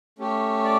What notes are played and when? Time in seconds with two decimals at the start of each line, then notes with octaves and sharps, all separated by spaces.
0.19 A3 C#4 G4
0.64 D5